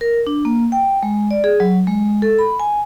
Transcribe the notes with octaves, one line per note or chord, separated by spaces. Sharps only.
A#4
D4
A#3
G5
G#3
D5
G#4
F#3
G#3
A4
B5
G#5